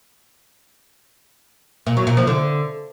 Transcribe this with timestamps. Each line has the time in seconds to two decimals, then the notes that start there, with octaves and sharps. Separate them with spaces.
1.87 A#2
1.97 F#3
2.07 A#2
2.17 F3
2.27 D3